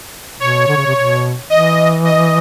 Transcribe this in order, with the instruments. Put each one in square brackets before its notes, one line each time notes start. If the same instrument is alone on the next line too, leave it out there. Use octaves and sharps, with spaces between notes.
[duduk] B2 [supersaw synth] C#5
[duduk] D3
C#3
C3
B2
[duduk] E3 [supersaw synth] D#5
[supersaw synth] D#5